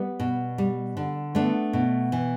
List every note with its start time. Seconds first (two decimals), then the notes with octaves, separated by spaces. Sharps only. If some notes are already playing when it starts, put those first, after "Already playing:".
Already playing: G3 B3
0.20 B2
0.58 G3
0.97 D3
1.35 A3 B3 D4
1.73 B2
2.12 E3